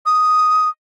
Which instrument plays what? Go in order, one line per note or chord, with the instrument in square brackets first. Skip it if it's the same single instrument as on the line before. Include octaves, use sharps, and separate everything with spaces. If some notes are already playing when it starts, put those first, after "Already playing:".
[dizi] D#6